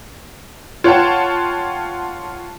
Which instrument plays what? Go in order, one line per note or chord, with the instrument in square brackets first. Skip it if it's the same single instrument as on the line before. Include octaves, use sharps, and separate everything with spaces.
[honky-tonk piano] F4 C#5 F#5 G5 A5